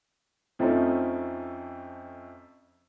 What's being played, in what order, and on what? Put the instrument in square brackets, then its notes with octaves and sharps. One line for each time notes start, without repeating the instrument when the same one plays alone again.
[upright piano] F2 F3 A3 C4 C#4 D#4